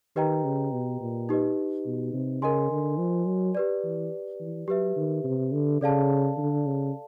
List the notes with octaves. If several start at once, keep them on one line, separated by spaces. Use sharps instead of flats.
D#3 G4 B4 D#5 G5 A#5
C#3
B2
A#2
D#4 G4 B4 D#5
B2
C3
C#3 A#4 D#5 G#5 C6
D3
F3
F#3
G4 B4 D5
E3
E3
F#3 G4 B4 E5
D#3
C3
D3
C#3 A4 D5 F5 A5
D3
C#3